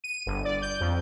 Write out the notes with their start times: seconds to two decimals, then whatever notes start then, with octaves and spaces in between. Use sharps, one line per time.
0.04 D#7
0.26 G1
0.45 D5
0.62 G6
0.80 F2